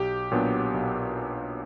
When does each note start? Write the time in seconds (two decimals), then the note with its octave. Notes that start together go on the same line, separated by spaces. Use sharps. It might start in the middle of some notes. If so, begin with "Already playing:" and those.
Already playing: B1 G4
0.32 A#2 F#3 B3 D4
0.74 B1